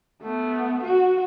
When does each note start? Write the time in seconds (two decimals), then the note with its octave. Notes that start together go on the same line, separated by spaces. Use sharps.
0.22 A3 B3
0.83 F#4